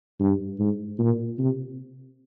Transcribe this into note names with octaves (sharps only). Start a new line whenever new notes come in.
G2
G#2
A#2
C3